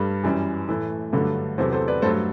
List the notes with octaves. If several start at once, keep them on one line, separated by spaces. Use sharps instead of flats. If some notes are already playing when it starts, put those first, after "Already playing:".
Already playing: G2 G3 A4
F#2 E3 G3
A2 E3 A3
G2 D3 F#3 A3
E2 C3 F#3 A4 C5
A4 C5
B4 D5
G2 F#3 A3 A4 C5